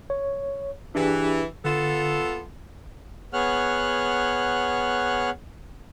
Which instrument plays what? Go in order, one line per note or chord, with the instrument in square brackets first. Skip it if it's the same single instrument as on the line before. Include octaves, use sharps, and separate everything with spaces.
[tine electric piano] C#5
[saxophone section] E3 [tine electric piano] D4 G4 G#4
[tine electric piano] D3 [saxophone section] B3 F4 A4
[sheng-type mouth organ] B3 G#4 C#5 F#5 F6 F#6